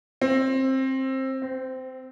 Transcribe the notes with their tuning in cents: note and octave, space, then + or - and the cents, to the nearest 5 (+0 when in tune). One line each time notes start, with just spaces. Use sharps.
C4 +20
C4 -15